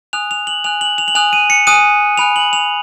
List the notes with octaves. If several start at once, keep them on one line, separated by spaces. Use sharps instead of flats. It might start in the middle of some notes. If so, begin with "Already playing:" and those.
G#5 D#6 F#6 F7
F7
F#7
G#5 D#6 F#6 F7
F#7
F7
F#7
G#5 D#6 F#6 F7
D#7
C#7
G#5 D#6 F#6 D#7
G#5 B5 F#6 F7
F#7
F7